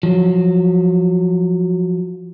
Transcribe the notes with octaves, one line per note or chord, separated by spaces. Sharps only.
F3 F#3